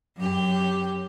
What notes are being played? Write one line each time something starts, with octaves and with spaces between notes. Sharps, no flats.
F#2 G4